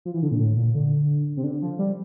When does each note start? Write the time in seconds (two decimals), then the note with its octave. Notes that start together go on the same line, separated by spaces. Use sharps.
0.05 F3
0.14 E3
0.23 D3
0.31 A#2
0.40 A2
0.57 A#2
0.75 D3
1.37 C3
1.44 D3
1.62 F3
1.79 G3